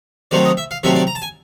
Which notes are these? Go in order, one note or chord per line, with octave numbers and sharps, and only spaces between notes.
C3 D#3 F#3 A3 C4 D5
D#5
E5
F5
C3 D#3 F#3 A3 C4 E5
D5
A#5
A5
G#5